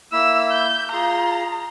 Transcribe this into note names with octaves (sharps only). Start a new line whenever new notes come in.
A#3 E4 B5 E6
G6
F4 G#4 A#5 C6